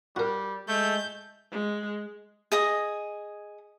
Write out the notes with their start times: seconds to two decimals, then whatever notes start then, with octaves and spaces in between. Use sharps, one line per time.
0.16 G3 F#4 A#4
0.68 G#3 A3 G6
1.51 G#3
2.52 G#4 D#5 D#6